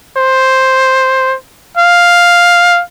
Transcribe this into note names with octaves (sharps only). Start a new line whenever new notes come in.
C5
F5